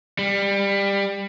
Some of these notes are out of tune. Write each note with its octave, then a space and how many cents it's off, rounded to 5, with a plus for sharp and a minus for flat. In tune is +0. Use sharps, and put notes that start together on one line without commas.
G3 +20